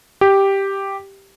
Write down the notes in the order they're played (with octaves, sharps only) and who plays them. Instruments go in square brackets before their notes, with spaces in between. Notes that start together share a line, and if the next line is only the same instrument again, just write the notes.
[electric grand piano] G4